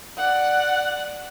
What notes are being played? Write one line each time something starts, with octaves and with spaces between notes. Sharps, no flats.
D5 F#5